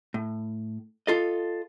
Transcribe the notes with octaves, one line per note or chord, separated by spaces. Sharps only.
A2
F4 A4 D#5